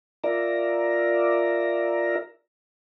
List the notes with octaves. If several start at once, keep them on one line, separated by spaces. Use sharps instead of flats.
F4 A#4 D5 E5 A#5